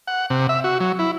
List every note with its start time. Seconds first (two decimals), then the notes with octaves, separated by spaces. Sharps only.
0.07 F#5
0.30 C3
0.49 E5
0.64 F#4
0.80 F#3
0.99 E4